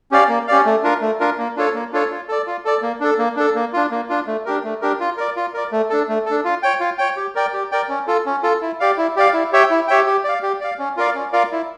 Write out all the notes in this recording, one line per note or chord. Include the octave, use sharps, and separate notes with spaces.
C#4 G4 D5 F5
A#3
C#4 G4 D5 F5
A3
D4 F4 A#4
A3
D4 F4 A#4
A#3
D4 F4 A4 C#5
A#3
D4 F4 A4 C#5
F4
A4 D5
F4
A4 D5
A#3
D4 A4
A#3
D4 A4
A#3
D4 F4
A#3
D4 F4
A3
D4 G4 A#4
A3
D4 G4 A#4
F4
A#4 D5
F4
A#4 D5
A3
D4 A4
A3
D4 A4
F4
C#5 G5
F4
C#5 G5
G4
A#4 D5 G5
G4
A#4 D5 G5
C#4
F4 A4
C#4
F4 A4
E4
G4 D5 F5
E4
G4 D5 F5
E4
G4 C#5 E5 G5
E4
G4 C#5 E5 G5
G4
D5 F5
G4
D5 F5
C#4
F4 A#4 D5 F5
C#4
F4 A#4 D5 F5
E4